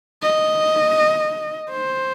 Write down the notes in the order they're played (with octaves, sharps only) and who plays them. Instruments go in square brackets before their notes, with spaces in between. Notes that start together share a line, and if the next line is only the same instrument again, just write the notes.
[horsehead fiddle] D#5
C5